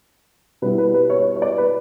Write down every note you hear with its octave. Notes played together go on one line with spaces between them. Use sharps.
B2 G3 B3 E4 B4
B4
B4
C#5
C#5
D5
B4